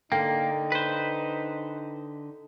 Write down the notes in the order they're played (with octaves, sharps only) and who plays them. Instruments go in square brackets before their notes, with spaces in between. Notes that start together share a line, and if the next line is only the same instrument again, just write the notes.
[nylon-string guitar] D3 [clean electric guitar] A#3 [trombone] D#4 [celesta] G5
[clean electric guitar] B4 C5